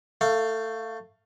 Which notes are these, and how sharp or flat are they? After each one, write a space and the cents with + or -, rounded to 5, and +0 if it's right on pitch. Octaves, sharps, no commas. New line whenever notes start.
A3 +20 F5 +0